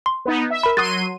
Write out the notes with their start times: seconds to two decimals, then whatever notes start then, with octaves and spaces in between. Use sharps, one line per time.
0.06 C6
0.25 B3 D#4
0.50 E5
0.63 A#4 B5
0.77 F#3 C6 D#6 F#6 A6 D#7